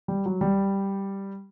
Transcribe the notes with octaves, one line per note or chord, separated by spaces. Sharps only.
G3
F#3
G3